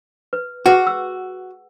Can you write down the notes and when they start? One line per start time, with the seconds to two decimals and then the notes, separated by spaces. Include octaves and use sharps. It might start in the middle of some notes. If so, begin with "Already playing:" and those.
0.33 B4
0.66 F#4 G#4 B4 F#5
0.87 E6